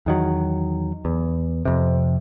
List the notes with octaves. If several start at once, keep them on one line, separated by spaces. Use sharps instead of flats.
E2 D#3 F#3
E2
F2 C3